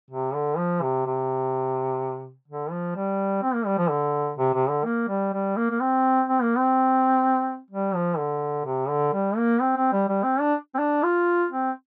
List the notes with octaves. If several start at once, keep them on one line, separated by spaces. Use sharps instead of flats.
C3
D3
F3
C3
C3
D3
F3
G3
C4
A#3
G3
F3
D3
C3
C3
D3
A#3
G3
G3
A#3
A#3
C4
C4
A#3
C4
G3
F3
D3
C3
D3
G3
A#3
C4
C4
G3
G3
C4
D4
C4
D4
F4
C4